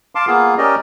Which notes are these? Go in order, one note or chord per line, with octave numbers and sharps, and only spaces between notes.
F5 A5 C6 D6
A#3 B3 F4 G#4 F5
C#4 G4 A#4 D5 D#5